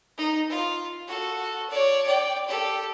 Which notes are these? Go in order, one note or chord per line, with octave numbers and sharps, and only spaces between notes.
D#4
F4
F#4 A4
C#5 D5
D5 G5
G4 A4